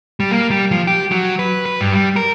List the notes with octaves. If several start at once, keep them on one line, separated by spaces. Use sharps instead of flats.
G3
A#3
G3
F3
G4
F#3
B4
B4
G2
G3
A#4